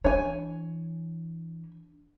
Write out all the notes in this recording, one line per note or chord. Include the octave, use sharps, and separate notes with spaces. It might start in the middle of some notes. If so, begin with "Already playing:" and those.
E3 D4 C#5 G#5